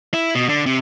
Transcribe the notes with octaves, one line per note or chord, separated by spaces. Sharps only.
E4
B2
D3
C3